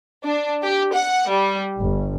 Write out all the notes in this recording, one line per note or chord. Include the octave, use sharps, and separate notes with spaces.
D4
G4
F#5
G3
G1